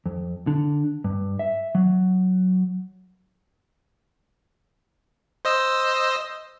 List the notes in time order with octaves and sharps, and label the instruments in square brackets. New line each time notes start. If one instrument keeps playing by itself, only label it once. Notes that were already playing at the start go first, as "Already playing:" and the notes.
[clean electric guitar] F2
D3
G2
E5
F#3
[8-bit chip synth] C5 D#5 E6